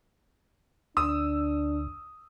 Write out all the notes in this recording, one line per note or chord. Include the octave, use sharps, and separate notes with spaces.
D2 D4 D#6 E6